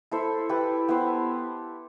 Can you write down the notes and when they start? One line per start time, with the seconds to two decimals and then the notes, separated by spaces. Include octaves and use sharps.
0.11 E4 A4 C5 E5
0.49 E4 G4 B4
0.88 B3 E4 G4 C5